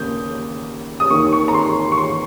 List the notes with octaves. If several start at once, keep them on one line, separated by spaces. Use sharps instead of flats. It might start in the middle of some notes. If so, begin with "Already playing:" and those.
Already playing: D#2 C#3 A#3 D#6 G6
D#6
D#2 D#3 A#3 C#6
C#6
A#5
C6
C#6
C6